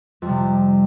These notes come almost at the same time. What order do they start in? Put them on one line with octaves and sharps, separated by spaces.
F2 G3 C3